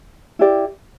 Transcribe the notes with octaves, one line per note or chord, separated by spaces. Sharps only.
E4 G4 D5